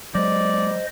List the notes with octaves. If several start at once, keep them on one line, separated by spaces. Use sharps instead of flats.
F#3 G#3 C5 D5 D#5